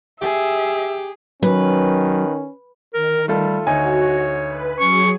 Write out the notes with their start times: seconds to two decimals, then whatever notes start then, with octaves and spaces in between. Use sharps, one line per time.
0.22 G4 G#4 E5
1.43 D#3 F#3 C#4 B4
2.94 D#3 A#4
3.28 G3 A3 F4 A4
3.67 D2 D#4 F#4 C#5 G#5
4.47 B4
4.80 F#3 C#4 G#4 C#6